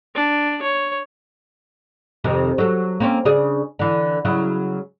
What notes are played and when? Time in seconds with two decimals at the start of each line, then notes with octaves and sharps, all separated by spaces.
0.15 D4
0.62 C#5
2.24 F2 C3 D#3
2.58 F#3 A4
3.00 A#3 C4 C#4
3.25 C#3 D4 G#4
3.79 D3 E3
4.25 C#3 F#3 E4